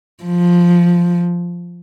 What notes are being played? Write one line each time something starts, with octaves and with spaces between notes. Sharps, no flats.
F3